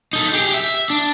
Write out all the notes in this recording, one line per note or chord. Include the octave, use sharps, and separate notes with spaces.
D#4 A4
G4 G#4
E5
D4